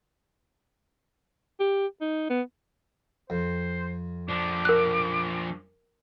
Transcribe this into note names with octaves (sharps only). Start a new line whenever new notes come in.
G4
D#4
B3
F2 C5
F3 D4 D6
A#4 F#6